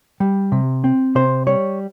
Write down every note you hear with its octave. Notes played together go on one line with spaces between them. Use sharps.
G3
C3
C4
C3 C5
G3 C#5